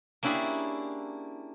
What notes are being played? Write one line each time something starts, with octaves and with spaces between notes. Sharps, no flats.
A#3 C#4 D4 E4 G4 G#4